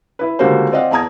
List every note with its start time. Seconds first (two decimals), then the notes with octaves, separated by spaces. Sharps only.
0.19 E4 B4
0.39 C#2 D3 G3 A#3 F#4 C5
0.72 C4 D5 D#5 F5 F#5
0.91 E2 A5 A#5 D#6 G#6